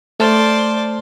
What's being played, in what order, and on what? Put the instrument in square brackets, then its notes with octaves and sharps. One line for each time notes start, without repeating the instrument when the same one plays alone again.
[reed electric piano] A3 A5 F6 [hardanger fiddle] C5 D5